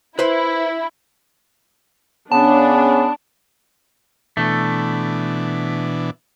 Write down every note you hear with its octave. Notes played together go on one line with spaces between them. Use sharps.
E4 B4 C5 B5
C#3 B3 C#4 D4 A5
B2 E3 A3 D4